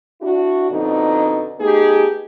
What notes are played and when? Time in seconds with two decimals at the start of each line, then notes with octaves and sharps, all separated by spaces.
0.21 D4 E4 F#4
0.70 F2 B2 D3 D#4
1.59 A3 B3 D#4 G4 G#4